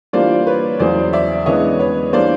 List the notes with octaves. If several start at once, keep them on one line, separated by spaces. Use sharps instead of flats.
E3 G3 A#3 D4 F4 C5 D5
B4 C#5
E2 C#3 F#3 C5 D5
D5 E5
C#3 E3 G#3 B3 D4 C#5 D#5
B4 C#5
E3 G3 A#3 D4 C5 D5